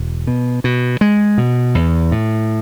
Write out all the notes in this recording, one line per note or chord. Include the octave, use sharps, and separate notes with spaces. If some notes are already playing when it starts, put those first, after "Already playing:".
Already playing: E1
B2
B2
G#3
B2
E2
A2